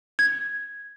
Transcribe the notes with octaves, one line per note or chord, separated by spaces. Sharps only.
G#6